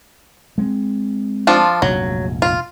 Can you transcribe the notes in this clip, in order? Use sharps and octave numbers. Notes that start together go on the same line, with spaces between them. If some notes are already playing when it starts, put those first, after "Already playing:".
G#3 B3 C4
F3 D4 F4
F1 A#1 G#2 F#3
F4